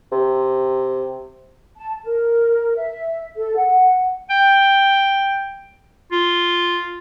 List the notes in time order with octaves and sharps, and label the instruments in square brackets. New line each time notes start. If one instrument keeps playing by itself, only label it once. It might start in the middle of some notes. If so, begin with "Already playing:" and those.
[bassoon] C3
[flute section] A5
A#4
E5
A4
F#5
[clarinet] G5
F4